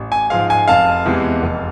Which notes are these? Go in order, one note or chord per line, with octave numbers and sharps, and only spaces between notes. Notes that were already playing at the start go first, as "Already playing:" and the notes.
Already playing: A1
G#5
G#2 F3 G#3 F5
G#5
F1 F5 A5
E2 C3 E3 G#3
F1